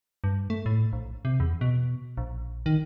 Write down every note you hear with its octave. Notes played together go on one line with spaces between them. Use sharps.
G2
A3
A2
A#1
C3
E2
B2
A#1
D#3